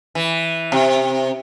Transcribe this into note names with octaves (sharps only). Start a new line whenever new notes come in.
E3
C3